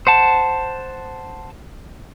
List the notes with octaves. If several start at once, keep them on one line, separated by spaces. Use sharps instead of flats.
C5 F#5 A5